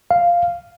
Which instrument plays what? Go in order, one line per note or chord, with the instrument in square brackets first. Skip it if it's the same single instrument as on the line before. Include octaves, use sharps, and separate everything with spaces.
[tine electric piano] F5